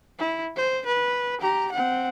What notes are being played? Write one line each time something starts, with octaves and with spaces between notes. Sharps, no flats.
E4
C5
B4
G4 A#5
C4 F#5